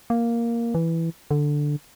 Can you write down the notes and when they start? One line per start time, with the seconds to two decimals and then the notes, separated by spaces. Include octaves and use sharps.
0.10 A#3
0.75 E3
1.31 D3